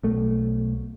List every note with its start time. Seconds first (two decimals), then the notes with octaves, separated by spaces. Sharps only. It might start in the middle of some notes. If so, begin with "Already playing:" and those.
0.03 B1 A3